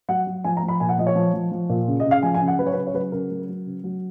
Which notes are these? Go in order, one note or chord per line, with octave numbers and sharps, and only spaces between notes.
F#3 F#5
F#3
F3 G#5
A#5
F3
B5
A#2 G#5
F#5
F3 D#5
C#5
F3
F3
F3
A#2
C#3
D#5
C#3
F5
F3 G#5
G#5
C#3
F#5
F#3 B4
C#5
B4
C#3
C#5
F#3 B4
C#3 A#4
F#3
F#3
C#3
F#3